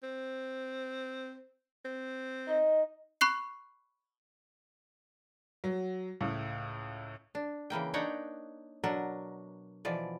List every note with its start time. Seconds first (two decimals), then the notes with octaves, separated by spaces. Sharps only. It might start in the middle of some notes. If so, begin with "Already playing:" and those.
0.03 C4
1.85 C4
2.48 D#4 D#5
3.21 B5 C#6 F#6 C7
5.64 F#3
6.21 C#2 A2
7.35 D4
7.70 C#3 E3 A#3 G5
7.94 D4 D#4 C#5 F#5 G5 A#5
8.84 B2 F#3 D4 A#4
9.85 B2 E3 F3 D5